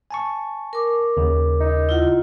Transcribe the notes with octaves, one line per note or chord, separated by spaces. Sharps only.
G#5 A5 C#6
A#4 D6
D#2 C#3
D#4
E4 F4 F#5